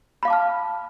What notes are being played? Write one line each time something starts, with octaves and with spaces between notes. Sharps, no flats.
F5 A5 B5 D6 F6